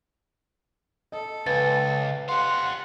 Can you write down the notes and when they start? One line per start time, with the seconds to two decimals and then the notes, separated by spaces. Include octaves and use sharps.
1.12 A4 D#5
1.46 C#2 B4 G#5 A6
2.29 G4 F5 F#5 C6